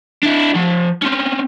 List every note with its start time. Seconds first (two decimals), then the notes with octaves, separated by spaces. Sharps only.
0.23 D4 E4
0.55 F3 F#5
1.03 C4 C#4